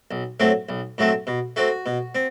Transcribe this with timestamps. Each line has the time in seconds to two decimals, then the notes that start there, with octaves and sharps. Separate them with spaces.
0.11 B1
0.40 A2 F#3 A3 C4
0.69 B1
0.98 A2 F#3 A3 C4
1.27 B2
1.56 A3 C4 F#4
1.86 B2
2.15 C4